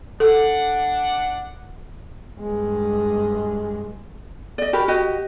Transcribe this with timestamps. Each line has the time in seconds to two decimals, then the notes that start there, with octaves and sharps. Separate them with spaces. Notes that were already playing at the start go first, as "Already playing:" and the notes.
0.20 D4 A4 D5 F#5
2.41 G2 G#3
4.58 D5 D#5
4.73 F#4 G4 A#4 B5
4.88 F#4 G4 D#5